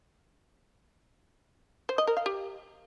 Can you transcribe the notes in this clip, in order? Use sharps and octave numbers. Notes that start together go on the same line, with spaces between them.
C5
D#5
A#4
F5
G4